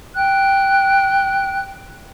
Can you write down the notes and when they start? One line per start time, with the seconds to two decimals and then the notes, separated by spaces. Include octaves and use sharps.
0.15 G5 F#6